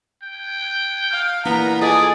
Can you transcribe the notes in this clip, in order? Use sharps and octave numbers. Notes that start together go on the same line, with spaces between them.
G5
F5
E3 A#3 B3 D4 A#5
F4 G#4 A4 D5 D#5 G#5